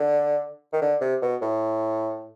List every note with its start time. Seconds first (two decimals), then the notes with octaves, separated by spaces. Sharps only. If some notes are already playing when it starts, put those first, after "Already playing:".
Already playing: D3
0.73 D#3
0.82 D3
1.01 C3
1.22 B2
1.42 A2